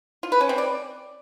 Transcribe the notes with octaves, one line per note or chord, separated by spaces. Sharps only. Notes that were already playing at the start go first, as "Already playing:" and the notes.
F4
B4
C#4
C4
D5